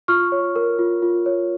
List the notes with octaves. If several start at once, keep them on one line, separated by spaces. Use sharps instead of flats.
F4 C#6 F6
C#5
A#4
F4
F4
C#5